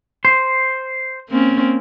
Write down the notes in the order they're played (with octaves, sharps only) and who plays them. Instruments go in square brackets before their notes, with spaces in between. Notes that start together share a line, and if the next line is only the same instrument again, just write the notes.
[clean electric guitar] C5
[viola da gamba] A#3 C4 C#4